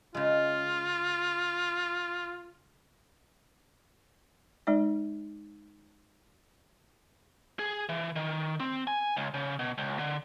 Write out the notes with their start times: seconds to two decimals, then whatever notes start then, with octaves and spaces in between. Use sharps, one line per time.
0.15 C#3 G#3 F4
4.67 G#3 D#4 D5
7.59 G#4
7.89 E3
8.16 D#3
8.60 C4
8.87 G#5
9.17 C#2
9.34 C#3
9.59 B2
9.78 C#2
9.99 D3